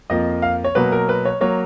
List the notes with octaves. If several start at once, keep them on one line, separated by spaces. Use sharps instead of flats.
F2 F3 A#3 D#5
F5
C#5
B2 F#3 A#3 B4
A#4
B4
C#5
F#3 A#3 C#5